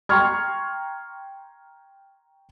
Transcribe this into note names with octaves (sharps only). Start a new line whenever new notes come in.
G5 A#5 C6 C#6 F6 G#6